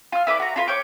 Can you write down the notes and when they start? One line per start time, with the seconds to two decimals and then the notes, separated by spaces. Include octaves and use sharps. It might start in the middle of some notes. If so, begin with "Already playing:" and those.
0.12 F4 F6
0.27 E4 B4 D5 D6
0.40 F#4 A#5
0.56 D4 F4 B4
0.67 C#5 G5 D6